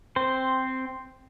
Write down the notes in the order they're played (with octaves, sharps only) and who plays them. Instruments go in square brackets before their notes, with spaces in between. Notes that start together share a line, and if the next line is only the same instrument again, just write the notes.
[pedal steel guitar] C4 C5